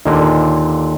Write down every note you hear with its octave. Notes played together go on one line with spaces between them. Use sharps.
D#2 A#2 D3 A#3